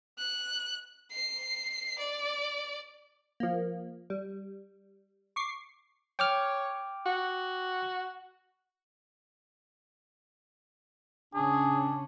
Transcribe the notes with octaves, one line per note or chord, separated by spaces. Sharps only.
F#6
C7
D5
F3 A#3
G3
C#6 D6 C7
C#5 G5 D6 F6
F#4
C#3 C#4 D4 G#4